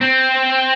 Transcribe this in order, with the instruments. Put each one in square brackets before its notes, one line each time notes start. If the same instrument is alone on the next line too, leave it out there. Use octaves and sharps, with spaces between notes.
[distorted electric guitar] C4